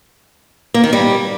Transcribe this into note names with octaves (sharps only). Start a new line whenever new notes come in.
A#3
D#3
G3